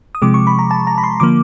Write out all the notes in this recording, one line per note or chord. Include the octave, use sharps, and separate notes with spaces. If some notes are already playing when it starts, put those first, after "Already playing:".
D#6
C3 F3 G#3 D6
C#6
B5
A#5
A5
A#5
B5
C6
D3 F3 A#3 D6